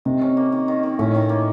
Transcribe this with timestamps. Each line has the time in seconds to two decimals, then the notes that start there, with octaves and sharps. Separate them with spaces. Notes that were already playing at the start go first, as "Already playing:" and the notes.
0.05 C3 D#3
0.22 C#4
0.37 A#3
0.52 D#3
0.68 D#3
0.83 D#3
0.99 A2 C#4
1.15 D#3
1.29 A#3